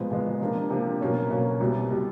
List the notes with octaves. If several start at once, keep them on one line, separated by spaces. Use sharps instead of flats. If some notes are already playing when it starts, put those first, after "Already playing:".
Already playing: A#2 F3 G#3 B3
A#2 F3 G#3 B3
C3 F3 A#3 D4
C3 F3 A#3 D4
B2 F#3 A#3 C#4
B2 F#3 A#3 C#4
C2 B2 G3
B2 G3